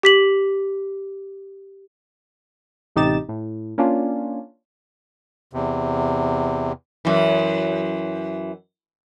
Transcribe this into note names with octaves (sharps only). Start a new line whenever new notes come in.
G4 B6 F#7
A1 C3 D#4 G4 A6 E7
A2
A#3 C#4 D4 F4
E2 C3
F#2 E3